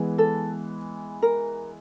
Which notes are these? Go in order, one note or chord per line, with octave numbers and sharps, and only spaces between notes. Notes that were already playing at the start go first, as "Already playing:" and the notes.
Already playing: E3 G#3 B3
A4
A#4